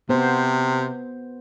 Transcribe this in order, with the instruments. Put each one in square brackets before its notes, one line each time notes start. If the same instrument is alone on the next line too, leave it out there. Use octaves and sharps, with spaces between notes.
[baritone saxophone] C3 [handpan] B3 C5